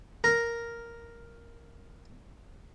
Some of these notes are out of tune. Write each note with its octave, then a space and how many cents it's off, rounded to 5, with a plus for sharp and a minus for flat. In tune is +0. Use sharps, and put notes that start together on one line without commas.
A#4 +0 A#5 +0